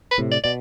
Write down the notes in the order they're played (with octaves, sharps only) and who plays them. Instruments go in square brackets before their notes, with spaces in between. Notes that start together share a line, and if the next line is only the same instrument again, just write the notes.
[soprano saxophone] B4
[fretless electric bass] A2 C3
[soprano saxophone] D5
[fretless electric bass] B2 [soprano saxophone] D5